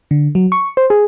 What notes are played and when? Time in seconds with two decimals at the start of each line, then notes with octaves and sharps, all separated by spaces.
0.11 D3
0.35 F#3
0.52 C#6
0.77 C5
0.90 G#4